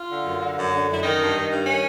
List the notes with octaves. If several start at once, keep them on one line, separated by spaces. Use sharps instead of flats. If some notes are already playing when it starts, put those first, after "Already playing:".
Already playing: F4
D3
F#2
D3
F#2
D3
F#2 E4
D#3 D#4
G2
D#3
G2
D#3 C#4